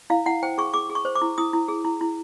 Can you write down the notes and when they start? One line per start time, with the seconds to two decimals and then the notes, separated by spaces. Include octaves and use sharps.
0.10 E4 F5
0.26 E4 F#5
0.43 C5 G5
0.58 G#4 C#6
0.74 G#4 D6
0.90 G#4
0.95 C#6
1.05 C5
1.16 D6
1.22 E4
1.38 E4 D#6
1.53 E4
1.68 G#4
1.85 E4
2.01 E4